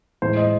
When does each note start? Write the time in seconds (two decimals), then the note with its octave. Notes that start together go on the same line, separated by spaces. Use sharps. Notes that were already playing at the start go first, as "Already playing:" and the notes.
0.22 A2 E3 G#3 C5
0.37 D#5